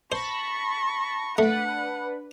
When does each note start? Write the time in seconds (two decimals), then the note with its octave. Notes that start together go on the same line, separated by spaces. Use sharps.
0.12 C5 A5 B5 C#6 A#6
1.38 A3 D4 B4 F#5